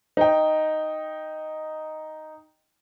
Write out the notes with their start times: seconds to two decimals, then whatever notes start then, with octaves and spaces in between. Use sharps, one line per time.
0.17 D#4 G5